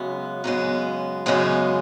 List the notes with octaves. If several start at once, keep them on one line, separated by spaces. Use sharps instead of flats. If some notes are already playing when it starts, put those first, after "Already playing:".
Already playing: F#2 C#3 G#3 B3
F#2 C#3 G#3 B3
F#2 C#3 G#3 B3